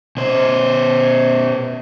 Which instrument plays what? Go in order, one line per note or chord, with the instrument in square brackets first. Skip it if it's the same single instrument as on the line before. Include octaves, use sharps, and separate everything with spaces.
[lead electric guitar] B2 C5